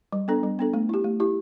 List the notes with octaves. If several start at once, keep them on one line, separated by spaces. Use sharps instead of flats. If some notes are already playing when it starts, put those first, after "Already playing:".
G3
B3 D4 A4
G3
B3 D4 A4
A3
E4 G4
A3
E4 G4